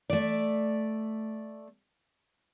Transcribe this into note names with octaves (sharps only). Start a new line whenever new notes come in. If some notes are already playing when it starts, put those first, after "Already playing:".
A3 D5